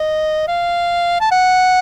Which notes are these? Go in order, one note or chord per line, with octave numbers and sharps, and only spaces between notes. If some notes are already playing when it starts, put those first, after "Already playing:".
Already playing: D#5
F5
A5
F#5